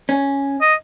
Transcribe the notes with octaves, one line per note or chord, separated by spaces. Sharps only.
C#4
D#5